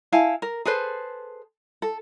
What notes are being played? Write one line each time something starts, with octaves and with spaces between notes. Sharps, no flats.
E4 F5 G#5 A5
A#4
G#4 A4 B4 C5
A4